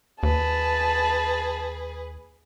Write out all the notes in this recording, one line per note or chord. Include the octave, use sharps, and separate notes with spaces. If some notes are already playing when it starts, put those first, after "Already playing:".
D#2 G#4 B4 A5